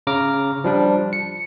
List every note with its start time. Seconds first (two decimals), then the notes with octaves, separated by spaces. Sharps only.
0.07 C#3 A#5 D6 F6
0.64 F3 G3 D4
1.13 C#7